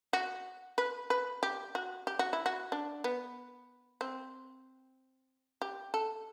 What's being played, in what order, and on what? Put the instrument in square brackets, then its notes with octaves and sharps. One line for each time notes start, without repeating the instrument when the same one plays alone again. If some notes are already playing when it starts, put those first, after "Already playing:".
[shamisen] F#4
B4
B4
G4
F#4
G4
F#4
E4
F#4
D4
B3
C4
G4
A4